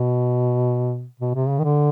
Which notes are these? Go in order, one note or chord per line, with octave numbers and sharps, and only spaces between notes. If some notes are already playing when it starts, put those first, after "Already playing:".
Already playing: B2
B2
C3
C#3
D#3
D3